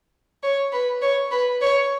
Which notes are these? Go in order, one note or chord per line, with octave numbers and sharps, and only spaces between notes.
C#5
B4
C#5
B4
C#5